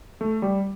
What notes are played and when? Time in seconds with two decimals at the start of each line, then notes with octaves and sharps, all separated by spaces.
0.21 A3
0.42 G3